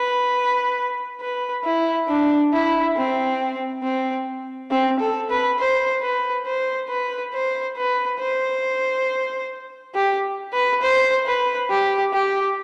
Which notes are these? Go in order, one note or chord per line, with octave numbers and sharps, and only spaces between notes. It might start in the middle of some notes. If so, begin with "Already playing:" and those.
Already playing: B4
B4
E4
D4
E4
C4
C4
C4
A4
B4
C5
B4
C5
B4
C5
B4
C5
G4
B4
C5
B4
G4
G4